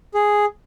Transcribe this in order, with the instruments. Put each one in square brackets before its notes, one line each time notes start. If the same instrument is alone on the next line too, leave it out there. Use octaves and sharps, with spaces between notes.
[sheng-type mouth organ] G#4